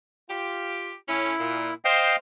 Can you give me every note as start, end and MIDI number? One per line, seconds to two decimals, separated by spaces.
0.29 0.92 65
0.29 0.92 67
1.09 1.33 45
1.09 1.33 61
1.09 1.74 64
1.40 1.70 46
1.85 2.13 72
1.85 2.16 75
1.85 2.16 77
1.85 2.16 79